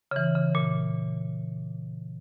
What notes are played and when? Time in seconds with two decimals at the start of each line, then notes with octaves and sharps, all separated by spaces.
0.11 C#3
0.16 E3
0.35 C#3
0.55 A#2